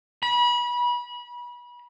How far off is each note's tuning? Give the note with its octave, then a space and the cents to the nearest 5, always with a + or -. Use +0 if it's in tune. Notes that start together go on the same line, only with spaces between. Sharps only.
B5 -30